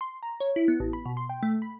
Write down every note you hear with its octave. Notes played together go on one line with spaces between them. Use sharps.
C6
A#5
C#5
E4
B3
A1
B5
B2
C6
G5
A3
B5